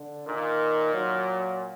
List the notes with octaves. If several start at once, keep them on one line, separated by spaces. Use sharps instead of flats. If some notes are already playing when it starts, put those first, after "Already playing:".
Already playing: D3
A#2 D#3
F#3